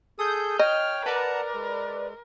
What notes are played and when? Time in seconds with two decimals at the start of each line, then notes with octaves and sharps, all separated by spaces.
0.19 G#4 A4 D#6 G6
0.59 C#5 D#5 G5 F6
1.06 A#4 B4 D5 F#5 A5 A#5
1.54 G#3